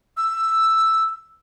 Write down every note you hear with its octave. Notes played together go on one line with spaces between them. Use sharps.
E6